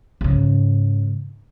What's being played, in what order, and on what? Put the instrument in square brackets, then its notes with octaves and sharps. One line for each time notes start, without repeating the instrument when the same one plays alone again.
[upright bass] G#2 C#3